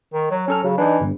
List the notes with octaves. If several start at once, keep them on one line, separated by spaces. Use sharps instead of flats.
D#3
F#3
F#3 C#4 A4 F6
C#3 F#3
E3 D4 D#4
G1 G2